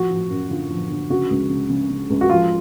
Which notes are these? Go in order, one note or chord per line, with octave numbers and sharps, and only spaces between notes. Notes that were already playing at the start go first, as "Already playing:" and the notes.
Already playing: F3 F#4
F3
F#2
D3 F4
F3
D3
C#3 F#4
C#2
C#3
C#3
C#3
C#2
F#4
F3 F4